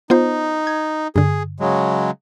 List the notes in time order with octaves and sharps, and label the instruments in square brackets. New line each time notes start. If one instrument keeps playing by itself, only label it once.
[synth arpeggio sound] B3 F4 C5 [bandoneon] D#4
[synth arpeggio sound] G#6
[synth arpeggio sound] G2 D3 [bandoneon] G#4
[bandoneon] C#3 F#3 G#3